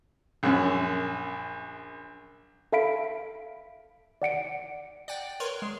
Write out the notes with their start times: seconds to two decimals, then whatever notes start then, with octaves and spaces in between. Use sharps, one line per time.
0.43 A#1 F#2
2.72 A4 E5 F5 B5 B6 D7
4.22 D5 F#5 C#7 D7
5.08 D5 F#5 G5
5.40 A#4 B4 C#5 C6 F6
5.62 G#3